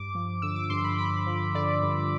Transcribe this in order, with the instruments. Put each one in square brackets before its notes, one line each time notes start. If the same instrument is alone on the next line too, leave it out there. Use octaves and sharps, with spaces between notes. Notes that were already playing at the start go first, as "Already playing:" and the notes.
Already playing: [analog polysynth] G2 D6
F3
D3 E6
D6
G2 C6
B5
G2 B5
F3
D3 D5
G2